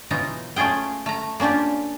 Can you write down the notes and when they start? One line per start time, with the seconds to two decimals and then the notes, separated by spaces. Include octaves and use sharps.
0.11 B2 E3 F#3 D#4 F4 A#5
0.56 A3 C#4 F4 G#4 G5
1.06 A3 A#5
1.40 A#3 C#4 D4 F4 G4